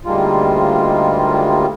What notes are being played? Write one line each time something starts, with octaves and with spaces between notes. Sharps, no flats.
D2 D#3 G3 G#3 A#3 F4